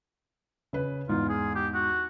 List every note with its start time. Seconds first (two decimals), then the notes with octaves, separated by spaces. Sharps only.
0.73 C#3 B4
1.09 E2 G#2 F4
1.29 G#4
1.55 G4
1.74 F#4